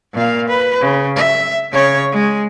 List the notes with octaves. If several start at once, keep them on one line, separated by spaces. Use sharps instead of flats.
A#2 F5
B4
C#3
E5
C#3 C#5
G#3